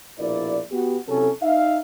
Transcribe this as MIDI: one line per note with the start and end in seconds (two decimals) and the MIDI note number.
0.19 0.60 34
0.19 0.60 47
0.19 0.60 58
0.19 0.60 64
0.19 0.60 74
0.71 0.97 59
0.71 0.97 66
0.71 0.97 67
1.08 1.30 48
1.08 1.30 54
1.08 1.30 61
1.08 1.30 64
1.08 1.30 69
1.42 1.79 63
1.42 1.79 76
1.42 1.79 77